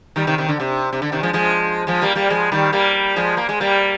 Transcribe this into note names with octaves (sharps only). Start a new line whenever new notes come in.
D#3 G3
C3 D#3
C3 D#3
D3
C3
C3
D3
C3 D#3
F3 G#3
F3 G#3
F3 G#3
G3 A#3
G3 A#3
F3 G#3
D#3 G3
G3 A#3
F3 G#3
A#3
G#3
G3 A#3